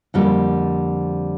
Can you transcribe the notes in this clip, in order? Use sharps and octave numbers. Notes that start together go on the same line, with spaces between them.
F2 D3 G3 A#3